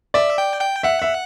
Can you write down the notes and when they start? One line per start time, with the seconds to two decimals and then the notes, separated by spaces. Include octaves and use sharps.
0.14 D5 E5
0.38 G5
0.61 G5
0.83 E5 F#5
1.02 E5